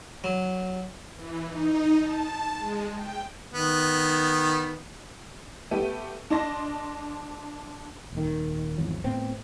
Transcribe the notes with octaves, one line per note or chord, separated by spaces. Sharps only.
F#3
E3
D#4
A5
G#3
G5
D#3 B3
A3 B3 G4 D#7
D4 D#5 A5 C6 A#6
D#1 D#3
G#1 E2 F3 F#3
A2 B3 C4